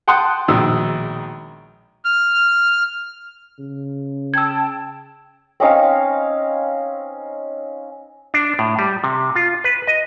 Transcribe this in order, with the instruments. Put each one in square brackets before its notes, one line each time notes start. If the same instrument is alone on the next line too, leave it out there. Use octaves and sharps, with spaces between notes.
[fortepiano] F#5 G5 A5 C6 D#6 F#6
A#1 B2 D#3 G#3 E6
[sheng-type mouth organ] F6
[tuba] C#3
[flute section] G5 A5 [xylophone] E6 G#6
[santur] C4 C#4 D#4 F5
[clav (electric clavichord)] D4
A2
G3
C3
F4
B4
D#5